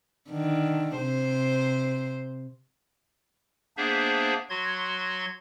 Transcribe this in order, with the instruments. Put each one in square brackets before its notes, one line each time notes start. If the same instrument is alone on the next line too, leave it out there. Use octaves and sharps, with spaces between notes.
[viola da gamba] D3 D#3
C3 C5
[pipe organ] A#3 B3 D4 G#4 C5 E5
F#3 F#4 C6 G#6